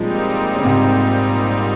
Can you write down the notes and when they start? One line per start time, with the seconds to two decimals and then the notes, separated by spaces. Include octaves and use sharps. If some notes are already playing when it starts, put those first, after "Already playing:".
Already playing: A#2 F3 G3 G#3 C4 D#4
0.56 C#3
0.64 G#2 C3